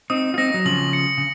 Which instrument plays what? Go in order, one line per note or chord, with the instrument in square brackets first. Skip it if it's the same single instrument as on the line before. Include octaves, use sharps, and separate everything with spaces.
[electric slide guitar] C4 D#4 [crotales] D#6
[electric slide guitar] F4
[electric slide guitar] C4 D#4 [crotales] A#6
[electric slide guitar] F#3
[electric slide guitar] C#3 F3 [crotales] F#7
[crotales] C#7
[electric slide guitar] C#3